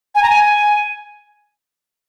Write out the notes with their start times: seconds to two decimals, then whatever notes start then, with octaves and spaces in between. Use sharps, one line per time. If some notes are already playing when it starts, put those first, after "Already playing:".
0.15 G#5
0.23 A#5
0.30 G#5